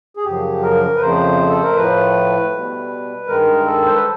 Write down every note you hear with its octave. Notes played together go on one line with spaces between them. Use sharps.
G#4
F#2 C#3 F3 G4
A#4
B4
F2 C#3 F3 A3 C5
A4
A#4
A2 F3 A3 B4
B2 G3
G2 D#3 G#3 A#4
A4
C5
B4